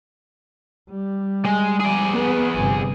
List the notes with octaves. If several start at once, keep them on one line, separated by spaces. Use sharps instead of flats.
G3
G#3
G#4 D5
B3
G1 C3